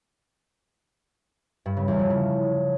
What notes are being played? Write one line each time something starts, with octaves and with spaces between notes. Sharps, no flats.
G2
C#3
E2
F3
C#3